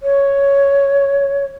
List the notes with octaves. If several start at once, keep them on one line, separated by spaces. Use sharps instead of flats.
C#5